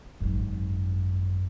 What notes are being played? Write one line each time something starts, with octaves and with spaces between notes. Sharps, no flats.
G#1 F#2